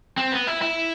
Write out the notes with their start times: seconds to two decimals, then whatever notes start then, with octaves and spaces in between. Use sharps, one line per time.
0.18 C4
0.32 B3
0.47 E4
0.62 E4